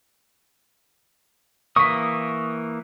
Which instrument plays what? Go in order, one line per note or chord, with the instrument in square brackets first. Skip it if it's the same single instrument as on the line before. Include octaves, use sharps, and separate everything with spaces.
[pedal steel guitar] E3 A#3 D#6 [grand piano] C#6 B6